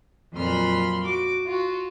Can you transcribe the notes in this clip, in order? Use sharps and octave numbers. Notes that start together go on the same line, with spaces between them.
F2 A#2 F#3 B5 C6 F6
F#4 D6
F4 F#4